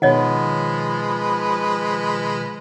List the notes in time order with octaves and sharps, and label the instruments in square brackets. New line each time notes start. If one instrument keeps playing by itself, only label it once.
[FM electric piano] B2 D#3 [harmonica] F3 G#3 B4 [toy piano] C#5 D#5 F#5